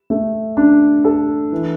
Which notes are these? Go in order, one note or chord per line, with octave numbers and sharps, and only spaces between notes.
A3
D4
A4
E3